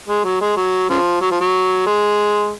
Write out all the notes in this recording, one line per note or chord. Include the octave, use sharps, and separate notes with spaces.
G#3
F#3
G#3
F#3
C#3 F3
F#3
F3
F#3
G#3